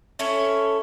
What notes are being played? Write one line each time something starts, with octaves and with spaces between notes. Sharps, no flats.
C#4 E4 A4 C#5